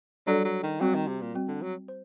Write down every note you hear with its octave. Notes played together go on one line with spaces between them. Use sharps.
F#3 G3 D4 A4 D5
F#3
D#3
F#3 G3 C4 F#4
D#3
C3
A#2
G3 C4 F#4
D3
F#3
C5